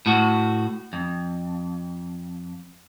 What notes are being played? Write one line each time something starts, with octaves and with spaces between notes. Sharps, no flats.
A2 F#4
F2